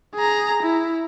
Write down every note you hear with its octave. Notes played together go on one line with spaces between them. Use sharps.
G#4 A#5
E4